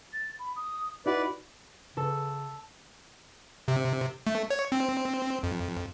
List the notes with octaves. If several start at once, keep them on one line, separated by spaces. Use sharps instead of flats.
A6
B5
D#6
D#4 E4 F#4 B4 D5 B5
C#3 A4
C3
A3
C#5
C4
F2